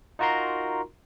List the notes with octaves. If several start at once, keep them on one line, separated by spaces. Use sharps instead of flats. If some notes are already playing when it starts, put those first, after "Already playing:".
D#4 F4 F#4 A#4 A#5 C6